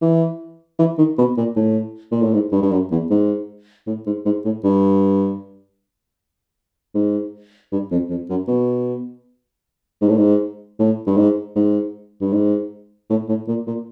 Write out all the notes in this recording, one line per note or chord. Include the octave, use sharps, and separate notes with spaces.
E3
E3
D#3
B2
A#2
A2
A#2
A2
G#2
G2
G2
F#2
E2
G#2
A2
G#2
G#2
A2
G2
G#2
G2
F2
F2
F#2
B2
G#2
A2
G#2
A2
G2
G#2
G#2
G2
G#2
A2
A2
A#2
A#2